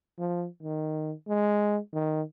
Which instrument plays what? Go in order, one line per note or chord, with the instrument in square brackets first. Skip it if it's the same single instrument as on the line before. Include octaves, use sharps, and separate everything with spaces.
[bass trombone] F3
D#3
G#3
D#3